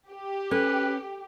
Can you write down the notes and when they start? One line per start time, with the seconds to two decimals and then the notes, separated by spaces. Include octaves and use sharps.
0.11 G4
0.51 C#4 A4 B4